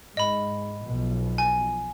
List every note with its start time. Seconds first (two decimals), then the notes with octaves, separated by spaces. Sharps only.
0.17 G#2 D#5 B5
0.86 B1 B2 F3
1.38 G#5